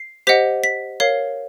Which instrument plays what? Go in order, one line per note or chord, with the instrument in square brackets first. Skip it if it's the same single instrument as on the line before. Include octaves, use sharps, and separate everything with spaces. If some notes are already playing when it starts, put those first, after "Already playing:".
Already playing: [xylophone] C7
G4 C5 D#5 F#5 B6
B6
A#4 C#5 F5 C7